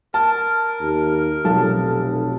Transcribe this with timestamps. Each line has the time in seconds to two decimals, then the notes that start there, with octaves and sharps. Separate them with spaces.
0.14 A#4 A5
0.80 D#2
1.45 F1 B1 A4 A5